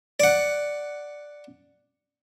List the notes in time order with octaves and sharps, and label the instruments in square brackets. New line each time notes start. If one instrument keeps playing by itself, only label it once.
[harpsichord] D5 F#5